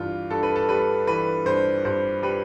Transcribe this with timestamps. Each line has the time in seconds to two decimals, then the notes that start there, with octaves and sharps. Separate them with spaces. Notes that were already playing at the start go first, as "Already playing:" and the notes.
Already playing: G2 E3 F4
0.30 G2 A4
0.43 B4
0.56 A4
0.69 G3 B4
1.07 E3 B4
1.45 G2 C5
1.85 G2 C5
2.22 G3 B4